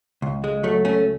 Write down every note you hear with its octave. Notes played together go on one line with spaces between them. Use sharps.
C#2
G#3
F#3 A3
A3 C#4